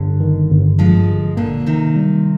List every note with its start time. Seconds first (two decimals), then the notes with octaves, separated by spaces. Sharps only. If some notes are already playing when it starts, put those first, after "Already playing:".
Already playing: G1 D3
0.20 D#3
0.50 G1
0.79 G2 F3 G#3
1.08 G1
1.37 A#2 D3 A#3
1.66 C3 D#3 D#4
1.96 G3